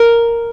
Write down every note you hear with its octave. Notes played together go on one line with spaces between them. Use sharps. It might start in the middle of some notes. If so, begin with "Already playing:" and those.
Already playing: A#4